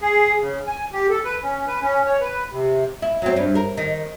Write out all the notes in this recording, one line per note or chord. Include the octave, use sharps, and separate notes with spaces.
G#4
C#3
G#5
G4
A4
B4
C#4
B4
C#4
C#5
B4
C3
E4
F#3 C4
G2
A#4
D#3